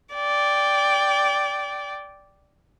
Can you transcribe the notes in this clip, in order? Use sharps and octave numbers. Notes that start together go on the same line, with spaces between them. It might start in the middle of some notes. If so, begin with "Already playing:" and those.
D5 G5